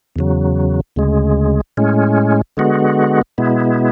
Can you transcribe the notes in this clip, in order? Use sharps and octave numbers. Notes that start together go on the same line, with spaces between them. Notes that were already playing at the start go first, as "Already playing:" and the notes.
E2 C#3 F#3
D2 C#3 G#3
A2 G#3 C#4
D3 G#3 B3 F#4
B2 G#3 B3 E4